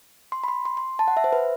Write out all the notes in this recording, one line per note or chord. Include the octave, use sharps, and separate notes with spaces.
C6
B5
C6
C6
C6
A5
F#5
E5
C5
B4